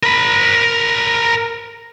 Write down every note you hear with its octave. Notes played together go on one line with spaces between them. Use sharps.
A#4 B5